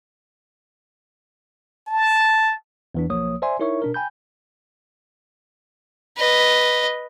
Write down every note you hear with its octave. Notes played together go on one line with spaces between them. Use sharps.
A5
E2 E3 D4
B1 F3 A#3 C#5 D#6
C5 D5 E5 G#5 C6
D#4 E4 A#4 C#5 E5 C#6
B2 D4 A#4
G5 G#5 B5 G6
B4 D#5